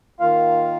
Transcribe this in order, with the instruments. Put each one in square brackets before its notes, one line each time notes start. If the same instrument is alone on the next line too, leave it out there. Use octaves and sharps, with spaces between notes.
[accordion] D#3 A#3 F4 F5